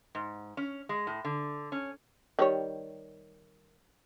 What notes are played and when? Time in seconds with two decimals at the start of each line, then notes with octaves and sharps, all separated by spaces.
0.15 G#2
0.57 C#4
0.89 G#3
1.07 A2
1.25 D3
1.72 C#4
2.39 D#3 G3 C#5